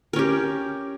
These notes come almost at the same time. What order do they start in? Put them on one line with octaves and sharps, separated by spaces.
A#4 C#4 G4